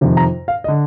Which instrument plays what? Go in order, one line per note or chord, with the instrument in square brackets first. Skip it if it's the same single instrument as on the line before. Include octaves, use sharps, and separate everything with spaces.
[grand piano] F2 C3 D#3
A#5
F5
D#5
D3